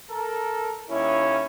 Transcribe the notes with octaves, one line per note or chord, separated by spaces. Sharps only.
A4 A#4
D#2 C#4 E4